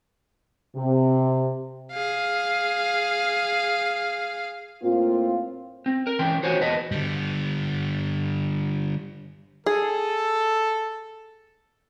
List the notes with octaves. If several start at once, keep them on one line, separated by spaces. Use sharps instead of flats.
C3
G#4 F5
A2 A#3 C4 F4
C4
A#4
E3 C#4 G5 C6
F4 F#4 C5 C#5 F#5 G#5
E2 B4 D#5 A5
D3 G3
G#4 A4